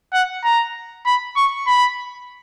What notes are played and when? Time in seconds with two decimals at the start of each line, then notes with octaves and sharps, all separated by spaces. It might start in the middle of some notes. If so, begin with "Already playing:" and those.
0.13 F#5
0.44 A#5
1.06 B5
1.36 C#6
1.67 B5